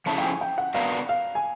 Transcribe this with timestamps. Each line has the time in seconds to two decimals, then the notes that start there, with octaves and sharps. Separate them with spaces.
0.06 F3 A3 C#4 E4 G#4 A5
0.18 G5
0.24 G#5
0.41 G5
0.58 F#5
0.74 B3 D4 F#4 A#4 F5
1.09 F5
1.35 G#5